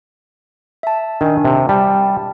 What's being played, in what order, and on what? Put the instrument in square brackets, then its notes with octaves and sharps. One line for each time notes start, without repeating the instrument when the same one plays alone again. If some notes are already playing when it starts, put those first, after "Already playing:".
[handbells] E5 A5
[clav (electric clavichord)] D#3 [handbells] D4 G#5
[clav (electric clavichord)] C3
[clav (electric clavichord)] G3 [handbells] A5